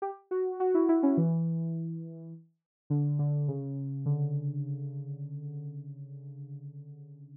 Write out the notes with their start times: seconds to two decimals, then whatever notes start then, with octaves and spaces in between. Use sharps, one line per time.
0.02 G4
0.31 F#4
0.60 F#4
0.74 E4
0.89 E4
1.03 C#4
1.17 E3
2.90 D3
3.19 D3
3.48 C#3
4.06 D3